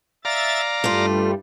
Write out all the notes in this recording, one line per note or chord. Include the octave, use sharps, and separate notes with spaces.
D5 E5 F5 A#5 A6
G2 G3 A3 F4